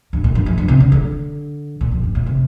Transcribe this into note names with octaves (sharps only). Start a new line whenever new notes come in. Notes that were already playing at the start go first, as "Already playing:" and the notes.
G2
A#2
G2
F2
G2
C3
D3
D3
A#2
F2
G2
A#2
C3